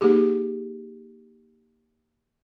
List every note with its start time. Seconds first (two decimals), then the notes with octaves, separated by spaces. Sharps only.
0.01 A#3 D#4 G4 G#4